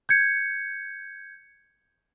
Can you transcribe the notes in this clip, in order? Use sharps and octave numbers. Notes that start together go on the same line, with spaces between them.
G6 G#6 C#7